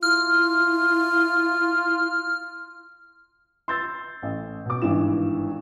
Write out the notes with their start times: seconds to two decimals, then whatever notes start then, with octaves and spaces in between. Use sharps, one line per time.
0.03 E4 F4 F6
3.68 C6 E6 G6 A6
4.23 A1
4.66 B2 D6
4.82 G#1 G2 E3 E7